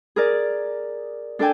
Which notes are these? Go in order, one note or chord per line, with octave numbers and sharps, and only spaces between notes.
G#4 A#4 D5
D4 A4 D5 G5 G#5